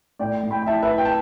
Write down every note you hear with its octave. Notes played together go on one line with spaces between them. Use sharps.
A2 D5 G5
A2
G5 B5
G5
E4 E5 A5
B4 E5
E4
G5
A5